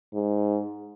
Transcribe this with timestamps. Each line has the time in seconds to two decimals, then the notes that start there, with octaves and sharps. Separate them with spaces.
0.14 G#2